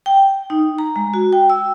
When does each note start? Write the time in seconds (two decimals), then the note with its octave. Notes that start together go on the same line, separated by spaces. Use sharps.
0.06 G5
0.50 D#4
0.78 A#5
0.96 G#3
1.14 F#4
1.33 G5
1.50 E6